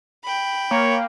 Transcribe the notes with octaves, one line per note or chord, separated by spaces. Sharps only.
G5 B5
A#3 C#5